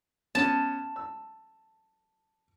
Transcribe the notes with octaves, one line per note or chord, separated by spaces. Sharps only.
B3 C#4 A5
E6